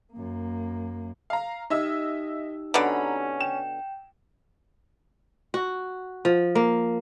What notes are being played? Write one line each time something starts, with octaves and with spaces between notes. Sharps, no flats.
F#2 A#3
F5 A#5
D#4 G4 D#5 E5 E6
B2 D3 C#4 A#5 B5
G5 E7
F#4
F3
A#3